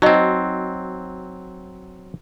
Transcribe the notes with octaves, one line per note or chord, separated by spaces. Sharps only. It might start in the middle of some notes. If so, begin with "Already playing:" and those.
F#3 C4 D#4 F#4 D#5